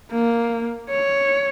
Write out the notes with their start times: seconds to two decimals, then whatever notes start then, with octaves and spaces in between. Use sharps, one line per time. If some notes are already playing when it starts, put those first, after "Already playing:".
0.11 A#3
0.89 C#5